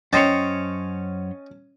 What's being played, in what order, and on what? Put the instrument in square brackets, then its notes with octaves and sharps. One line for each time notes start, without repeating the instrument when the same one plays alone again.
[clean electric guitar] F#2 C5 C#5 [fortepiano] C#4 [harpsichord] D#5 G5 A5